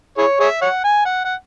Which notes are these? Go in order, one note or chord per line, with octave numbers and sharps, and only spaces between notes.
E4 G#4 C#5
G#4 C#5 E5
C#5 F#5
G#5
F#5
F#5